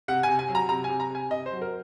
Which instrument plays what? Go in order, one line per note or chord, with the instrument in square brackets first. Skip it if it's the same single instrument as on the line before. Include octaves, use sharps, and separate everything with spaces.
[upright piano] C3 F#5
C3 G#5
G#5
F#3
A#5
C3 A#5
G#5
C3
A#5
C3 G#5
C3 D#5
C5
F#3
A#4